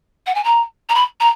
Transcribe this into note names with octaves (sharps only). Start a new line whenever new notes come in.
F#5
G#5
A#5
A#5
B5
A#5